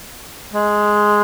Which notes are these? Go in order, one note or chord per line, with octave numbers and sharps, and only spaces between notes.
G#3